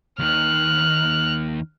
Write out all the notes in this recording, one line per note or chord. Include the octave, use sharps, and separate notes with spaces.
D#2 D#3 F6 F#6